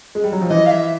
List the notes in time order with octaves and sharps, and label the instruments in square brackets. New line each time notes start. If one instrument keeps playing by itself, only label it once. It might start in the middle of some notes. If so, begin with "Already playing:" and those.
[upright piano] G#3
G3
F#3
F3
[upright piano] E3 [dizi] D#5
[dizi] F5
E5